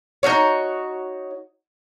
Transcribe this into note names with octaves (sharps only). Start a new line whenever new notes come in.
D#4 F4 F#4 C#5